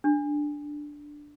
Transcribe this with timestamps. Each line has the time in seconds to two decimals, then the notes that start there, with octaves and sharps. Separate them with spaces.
0.04 D4